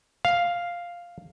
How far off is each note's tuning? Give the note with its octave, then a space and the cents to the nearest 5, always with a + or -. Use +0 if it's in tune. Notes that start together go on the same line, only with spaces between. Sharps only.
F5 +0